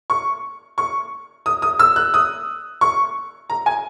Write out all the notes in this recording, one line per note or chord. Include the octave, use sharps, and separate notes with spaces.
C#6
C#6
D#6
D#6
E6
F#6
D#6
C#6
A#5
G#5